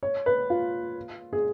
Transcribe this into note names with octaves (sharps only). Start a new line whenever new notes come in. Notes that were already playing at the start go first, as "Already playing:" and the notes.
C#5
B4
F4
G#4